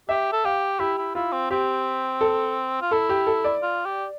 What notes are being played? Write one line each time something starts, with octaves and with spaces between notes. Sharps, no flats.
G4 E5
A4
G4 F5
E4 G4
E4
E4 F4
C4
C4 G4
A4
F4
E4 A4
G4
A4
D5
F4
G4